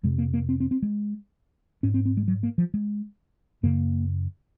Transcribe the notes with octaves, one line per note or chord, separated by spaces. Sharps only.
F2 C3 G#3
A#3
A#3
C4
C4
C4
G#3
G#2 C#4
C4
C4
G#3
F#3
A#3
F3
G#3
F#2 C#3 A#3